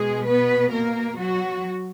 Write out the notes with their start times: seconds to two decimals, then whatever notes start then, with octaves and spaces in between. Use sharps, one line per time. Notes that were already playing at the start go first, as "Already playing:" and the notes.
Already playing: B2 G#3 G#4
0.26 B3 B4
0.72 A#3 A#4
1.18 F#3 F#4